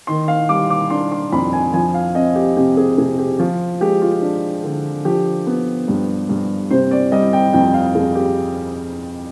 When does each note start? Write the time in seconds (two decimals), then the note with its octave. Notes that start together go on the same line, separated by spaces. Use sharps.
0.07 D#3 C6
0.28 F5
0.49 G3 D6
0.70 D6
0.90 D4 C6
1.12 C6
1.32 F2 B5
1.53 G#5
1.73 F3 G#5
1.94 F5
2.15 C4 D#5
2.36 G4
2.57 C3 G4
2.77 G#4
2.98 C3 G#4
3.18 G4
3.39 F3 F4
3.81 G#3 G4
4.02 F4
4.22 D4
4.64 D3
5.05 F3 G4
5.47 B3
5.88 G2
6.29 G2
6.71 C3 C5
6.91 D5
7.12 G3 D#5
7.33 G5
7.53 F2 G5
7.74 F5
7.95 F2 G#4
8.15 G4